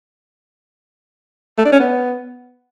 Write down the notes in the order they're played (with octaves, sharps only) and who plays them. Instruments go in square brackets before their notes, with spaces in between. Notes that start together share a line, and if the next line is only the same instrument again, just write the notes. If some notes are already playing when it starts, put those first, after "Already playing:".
[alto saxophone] A3
D4
C#4
B3